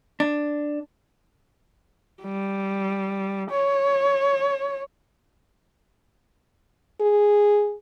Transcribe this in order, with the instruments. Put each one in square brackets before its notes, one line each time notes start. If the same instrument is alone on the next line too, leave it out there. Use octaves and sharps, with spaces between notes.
[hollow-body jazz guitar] D4
[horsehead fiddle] G3
C#5
[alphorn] G#4